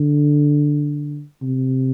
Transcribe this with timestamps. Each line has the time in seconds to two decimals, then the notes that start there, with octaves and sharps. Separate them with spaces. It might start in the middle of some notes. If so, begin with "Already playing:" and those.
Already playing: D3
1.42 C3